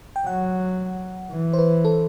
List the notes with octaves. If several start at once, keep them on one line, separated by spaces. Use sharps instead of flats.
G5
F#3 F#5
E3
C5
B4
A4